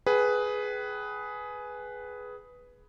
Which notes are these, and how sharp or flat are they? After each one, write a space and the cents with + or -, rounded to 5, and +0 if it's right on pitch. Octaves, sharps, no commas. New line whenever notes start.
G#4 +10 B4 +0 G5 -25